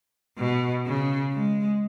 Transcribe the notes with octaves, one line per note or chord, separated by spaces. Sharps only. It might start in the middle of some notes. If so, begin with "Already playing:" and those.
B2
C#3
G#3